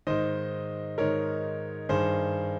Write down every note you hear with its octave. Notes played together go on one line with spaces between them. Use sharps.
G#2 D#3 C5 D#5
G#2 D#3 A#4 C#5
G2 D#3 G#4 C5